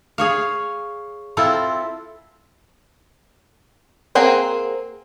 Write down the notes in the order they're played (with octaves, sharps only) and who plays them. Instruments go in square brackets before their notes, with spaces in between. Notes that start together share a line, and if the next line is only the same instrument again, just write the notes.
[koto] G#4 C#5 F5
C4 E4 F4 A4
[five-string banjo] A#3 C4 G#4 F#5 A#5